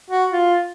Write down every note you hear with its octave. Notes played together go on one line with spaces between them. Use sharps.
F#4
F4